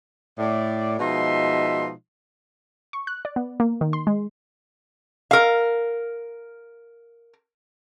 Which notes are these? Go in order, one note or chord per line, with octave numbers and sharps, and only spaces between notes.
A2 D5
B2 F3 G#3 D#4 E5 C6
C#6
F#6
D5
B3
A#3
D#3
C6
G#3
A#4 F5